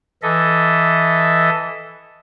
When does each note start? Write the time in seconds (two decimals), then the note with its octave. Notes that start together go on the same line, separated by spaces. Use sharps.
0.23 E3 A4 D#5 E5